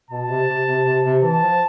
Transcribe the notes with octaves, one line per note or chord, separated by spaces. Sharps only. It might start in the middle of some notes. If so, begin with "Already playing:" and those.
B2 A5
C3
C3
C3
C3
C3
E3 A5
F3